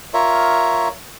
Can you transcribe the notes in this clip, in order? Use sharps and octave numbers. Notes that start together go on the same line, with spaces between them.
F4 A#4 C#5 E5